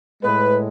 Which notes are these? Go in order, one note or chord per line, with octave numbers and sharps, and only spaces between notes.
A2 G#3 B4